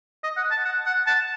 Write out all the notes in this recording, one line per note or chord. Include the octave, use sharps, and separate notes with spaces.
D#5
F#5
A5
F#5
F#5
A5